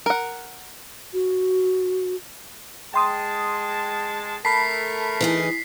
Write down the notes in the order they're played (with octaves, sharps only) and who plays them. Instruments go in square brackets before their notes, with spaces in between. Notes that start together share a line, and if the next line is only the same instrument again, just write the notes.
[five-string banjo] A#4 F#5
[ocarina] F#4
[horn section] G#3 A5 [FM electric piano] G5 C6 D#6
[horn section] A3 A#4 [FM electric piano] A5 B5 [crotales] B6 C7
[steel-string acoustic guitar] E3 D#4 G#4